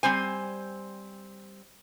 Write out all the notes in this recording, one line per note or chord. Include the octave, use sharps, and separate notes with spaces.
G3 C4 C5 G#5